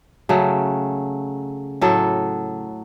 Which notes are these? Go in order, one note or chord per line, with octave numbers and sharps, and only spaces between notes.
C#3 F#3 A3
A2 F#3 A4